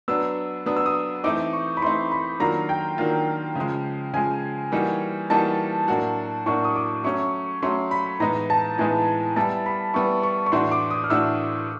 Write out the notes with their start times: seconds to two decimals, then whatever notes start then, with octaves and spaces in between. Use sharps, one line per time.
0.08 F#3 B3 D4 E6
0.66 F#3 B3 D4 D#6
0.76 E6
0.86 D#6
1.24 E3 A3 C4 D#4 D6
1.53 C#6
1.77 B5
1.82 E3 A3 C4 D#4 C6
2.12 B5
2.40 D#3 F#3 A#3 D4 F4 A#5
2.69 G5
2.98 D#3 F#3 A#3 D4 F4
3.56 C#3 F3 G#3
4.14 C#3 F3 G#3 G#5
4.72 E3 G3 A#3 D#4 F#4
5.30 E3 G3 A#3 D#4 F#4 A5
5.88 A2 F#3 A#3 D4 F#4
6.46 A2 F#3 A#3 D4 F#4 C#6
6.64 D#6
6.76 D6
7.04 F#3 A3 C#4 C#6
7.62 F#3 A3 C#4 C6
7.91 B5
8.20 A2 E3 G#3 B3 D#4 A#5
8.50 A5
8.78 A2 E3 G#3 B3 D#4 G#5
9.36 G3 B3 E4 A5
9.66 B5
9.94 G3 B3 E4 C#6
10.23 C#6
10.46 C#6
10.52 A2 E3 A3 D4 F#4 C6
10.71 D6
10.91 D#6
11.04 F6
11.10 A2 E3 A3 D4 F#4 E6